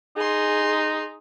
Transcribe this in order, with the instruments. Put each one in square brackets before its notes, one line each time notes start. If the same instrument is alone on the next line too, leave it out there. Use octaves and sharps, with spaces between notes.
[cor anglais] D#4 [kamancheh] G#4 C6